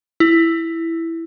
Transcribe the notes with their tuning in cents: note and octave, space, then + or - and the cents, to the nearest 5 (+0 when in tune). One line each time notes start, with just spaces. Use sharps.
E4 +5